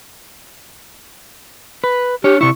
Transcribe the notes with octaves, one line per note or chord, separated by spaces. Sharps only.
B4
D4 G4 C#5
C3 E4 C#6